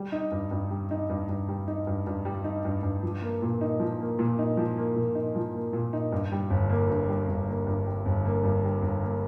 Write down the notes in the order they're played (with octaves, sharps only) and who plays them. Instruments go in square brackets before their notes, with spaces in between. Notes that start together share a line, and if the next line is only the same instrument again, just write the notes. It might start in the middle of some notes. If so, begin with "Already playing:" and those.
Already playing: [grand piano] G3
D#4
G2
G2
G3
D#4
G2
G2
G3
D#4
G2
G2
G3
D#4
G2
G2
F3
A#3
A#2
D#4
F3
A#3
A#2
D#4
F3
A#3
A#2
D#4
F3
A#3
A#2
D#4
G2
G3
G1
A#3
G2
G3
G1
A#3
G2
G3
G1
A#3
G2
G3
G1
A#3